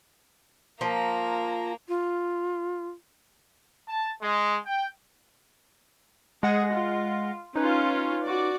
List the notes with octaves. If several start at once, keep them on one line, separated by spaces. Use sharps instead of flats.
F3 A#3 A#5
F4
A5
G#3
G5
G#3 G#4 F#5 A#6
F4
C#4 D#4 F4 B4
F#4 D5